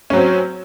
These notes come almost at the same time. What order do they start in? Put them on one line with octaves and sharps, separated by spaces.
C#4 F#3 C4